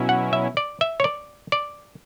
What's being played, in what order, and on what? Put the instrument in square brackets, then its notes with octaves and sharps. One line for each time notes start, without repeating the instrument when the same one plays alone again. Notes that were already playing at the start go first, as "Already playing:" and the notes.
Already playing: [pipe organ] B2 F#3 C#4 E4
[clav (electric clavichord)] F#5
E5
D5
E5
C#5
D5
D5